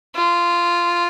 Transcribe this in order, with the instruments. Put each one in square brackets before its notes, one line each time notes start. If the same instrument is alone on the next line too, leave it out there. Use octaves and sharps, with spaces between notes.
[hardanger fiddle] F4